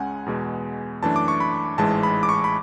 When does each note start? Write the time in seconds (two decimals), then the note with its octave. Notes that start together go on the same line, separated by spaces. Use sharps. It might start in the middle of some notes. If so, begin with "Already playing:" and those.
Already playing: C#2 C#3 G#3 C#4 F#5 G#5
0.26 E2 B2 G#3 B3
1.03 F#2 E3 A3 D4 A5
1.16 D6
1.28 C#6
1.40 B5
1.78 A1 G#2 E3 G#3 A5
2.03 B5
2.23 D6
2.29 C#6
2.44 B5